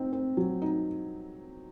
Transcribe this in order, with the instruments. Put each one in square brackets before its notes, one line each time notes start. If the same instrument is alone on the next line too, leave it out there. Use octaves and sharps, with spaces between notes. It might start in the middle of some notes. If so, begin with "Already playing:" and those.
Already playing: [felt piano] C4 D#4
C4
F#3
D#4